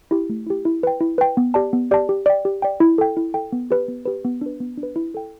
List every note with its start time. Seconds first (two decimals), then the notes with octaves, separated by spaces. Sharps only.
0.11 E4 G4
0.29 A3
0.46 E4 G4
0.65 E4
0.83 B4 G5
1.01 E4
1.18 B4 G5
1.37 B3
1.54 G4 D5 A5
1.73 B3
1.91 G4 D5 A5
2.09 G4
2.26 D5 G5
2.45 G4
2.62 D5 G5
2.80 E4
2.98 A4 G5
3.17 E4
3.34 A4 G5
3.53 B3
3.71 G4 B4
3.88 B3
4.05 G4 B4
4.25 B3
4.41 D4 B4
4.60 B3
4.77 D4
4.83 B4
4.96 E4
5.14 A4 G5